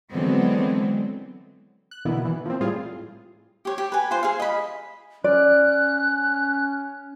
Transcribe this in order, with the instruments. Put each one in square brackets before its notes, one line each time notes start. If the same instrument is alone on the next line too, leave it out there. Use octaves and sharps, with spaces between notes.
[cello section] D3 E3 F#3 G#3 B3 C4
[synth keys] F#6
B2 D3 E3 A#3 B3 E4
E3
F3 A#3 C4
A2 G3 F4 G#4
[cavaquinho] G4 C#5
G4
B4 G#5
F4 C5
G#4 F5
D#5 B5
[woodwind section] C#4 [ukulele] D5 [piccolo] F#6